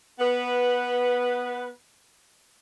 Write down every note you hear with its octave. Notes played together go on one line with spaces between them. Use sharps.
B3 B4